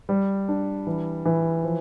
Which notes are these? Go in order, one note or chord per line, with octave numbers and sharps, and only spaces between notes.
G3
D4
E3
E3
F3